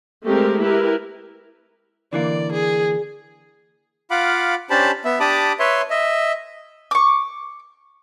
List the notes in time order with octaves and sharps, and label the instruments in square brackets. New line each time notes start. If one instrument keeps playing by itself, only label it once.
[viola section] G#3 A3 C4 G4 A#4
E4 G4 A#4 B4
[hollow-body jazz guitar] D3 E3 A#3 [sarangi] D5
[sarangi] G#4
[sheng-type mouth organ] F4 F5 F#5 B5 D6
C#4 D4 G4 C5 A5 B5
B3 E5
D4 G4 A5 B5 D6 D#6
B4 C#5 E5 C6
D#5 E5
[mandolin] C#6 D6